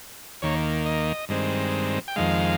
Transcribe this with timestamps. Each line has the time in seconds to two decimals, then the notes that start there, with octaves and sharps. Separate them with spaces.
0.42 D#2 D#3 A#3 C#5
0.86 D#5
1.29 G2 D#3 G#3 C4
2.08 G5
2.16 F2 D#3 G#3 F5